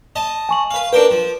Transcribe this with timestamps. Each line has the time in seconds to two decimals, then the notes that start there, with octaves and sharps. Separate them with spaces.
0.16 D#5 A5
0.49 G#5 C#6 F#7
0.71 B4 F5
0.93 D4 A#4 B4 G5 D7
1.11 F3